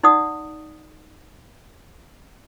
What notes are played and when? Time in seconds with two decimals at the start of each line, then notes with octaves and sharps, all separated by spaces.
0.03 D#4 D5 F#5 D#6